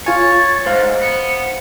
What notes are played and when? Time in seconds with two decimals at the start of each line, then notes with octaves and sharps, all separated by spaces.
0.06 F4 C#5 G#5 A6
0.33 G#6
0.66 G#2 C5 F5
1.02 B3 C#7